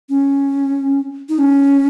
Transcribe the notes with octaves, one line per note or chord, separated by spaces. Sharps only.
C#4
D#4
C#4